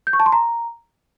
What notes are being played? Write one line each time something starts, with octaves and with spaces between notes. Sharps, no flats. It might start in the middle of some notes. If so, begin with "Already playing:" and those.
G6
C#6
A5
C6
A#5